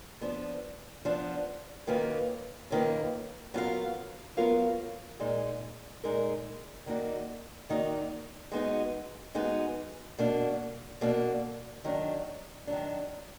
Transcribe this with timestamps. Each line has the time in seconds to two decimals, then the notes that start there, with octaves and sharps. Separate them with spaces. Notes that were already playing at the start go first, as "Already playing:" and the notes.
0.21 F3 B3 D4
1.05 F3 B3 D4
1.87 F#2 D#3 A#3 F4 B4
2.70 F#2 D#3 A#3 F4 B4
3.54 F#3 B3 F4 A#4 F5
4.37 F#3 B3 F4 A#4 F5
5.20 A#2 G#3 D#4 A#4
6.04 A#2 G#3 D#4 A#4
6.86 D#3 A#3 D#4 F#4 D5
7.69 D#3 A#3 D#4 F#4 D5
8.52 G#3 B3 D#4 F#4
9.35 G#3 B3 D#4 F#4
10.18 B2 A#3 D4
11.01 B2 A#3 D4
11.84 D#3 F#3 D4
12.67 D#3 F#3 D4